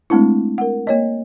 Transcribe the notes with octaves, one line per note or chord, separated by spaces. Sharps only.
G#3 A3 C4 D4 E4
A#4 F#5
A#3 C#5 D#5